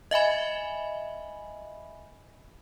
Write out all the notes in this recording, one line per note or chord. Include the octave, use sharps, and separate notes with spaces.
D#5 E5 G#5 B5